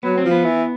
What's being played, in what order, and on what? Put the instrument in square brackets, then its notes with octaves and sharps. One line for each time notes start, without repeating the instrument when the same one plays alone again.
[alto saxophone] F#3 [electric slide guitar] B3
[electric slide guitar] C4
[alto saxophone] F3
[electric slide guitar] B3
[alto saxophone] E3